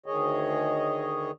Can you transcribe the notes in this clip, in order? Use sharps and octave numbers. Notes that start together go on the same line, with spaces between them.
D2 D#3 G#4 C#5 D#5